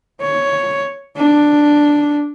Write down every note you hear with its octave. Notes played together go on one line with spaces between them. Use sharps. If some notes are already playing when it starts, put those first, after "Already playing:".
C#5
D4